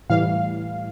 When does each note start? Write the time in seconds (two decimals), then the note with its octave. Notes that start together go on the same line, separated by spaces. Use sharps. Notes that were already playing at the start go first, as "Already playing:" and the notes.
0.10 A2 E3 G3 F5